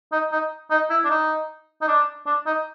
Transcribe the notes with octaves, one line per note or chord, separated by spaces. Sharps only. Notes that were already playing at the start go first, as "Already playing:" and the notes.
D#4
D#4
D#4
E4
D4
D#4
D#4
D4
D4
D#4